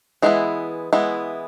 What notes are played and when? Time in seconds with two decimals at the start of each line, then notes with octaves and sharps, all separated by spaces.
0.22 E3 G#3 B3 E4
0.93 E3 G#3 B3 E4